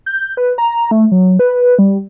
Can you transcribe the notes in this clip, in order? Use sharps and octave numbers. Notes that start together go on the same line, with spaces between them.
G6
B4
A#5
A3
F#3
B4
G3